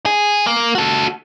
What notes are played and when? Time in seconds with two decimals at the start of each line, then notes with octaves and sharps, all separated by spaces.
0.06 G#4
0.47 A#3
0.75 F#4 A4